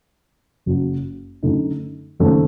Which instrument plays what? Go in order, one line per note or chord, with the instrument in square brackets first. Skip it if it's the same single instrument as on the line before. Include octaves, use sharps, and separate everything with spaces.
[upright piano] F#1 F#2 F#3
F#2 D3 A3 D#4
F#1 F#2 D#3 A3 C4